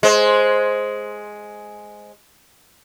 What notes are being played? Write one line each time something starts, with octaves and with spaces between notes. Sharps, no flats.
G#3 C5